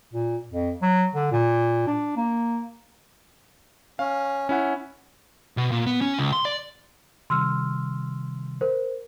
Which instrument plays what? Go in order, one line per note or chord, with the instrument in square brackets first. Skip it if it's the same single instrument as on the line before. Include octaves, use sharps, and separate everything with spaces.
[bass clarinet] A#2
F2
F#3
D3
A#2
D4
A#3
[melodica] C#4 [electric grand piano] F5
[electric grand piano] C#4 E4 F#5
[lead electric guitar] B2
A#2
B3
C#4
C#2
C6
D5
[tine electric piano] C3 D#3 G3 [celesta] C6 E6 F6
[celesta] A#4 C5